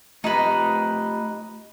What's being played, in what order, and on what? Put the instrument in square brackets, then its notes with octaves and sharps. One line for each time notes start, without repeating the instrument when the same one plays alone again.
[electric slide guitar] A3 F4 G4 [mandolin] D#4 B4